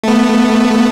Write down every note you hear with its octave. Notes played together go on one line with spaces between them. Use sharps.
A3 B3